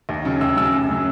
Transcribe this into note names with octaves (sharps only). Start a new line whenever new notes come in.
D#2
C#3 F#3
D#2 E6
C#3 F#3 E6
F#2
C#3 F#3